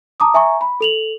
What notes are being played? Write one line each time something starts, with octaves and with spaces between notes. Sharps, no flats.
A5 A#5 D6 D#6
E5 G#5 A#5 C#6
B5
A4 F7 F#7